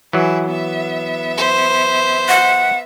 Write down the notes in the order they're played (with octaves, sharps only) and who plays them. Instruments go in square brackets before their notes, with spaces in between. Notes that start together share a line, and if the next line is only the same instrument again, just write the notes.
[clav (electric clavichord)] E3 F#3 [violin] E4 G#4
[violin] B3 E5
[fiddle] C5
[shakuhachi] F#5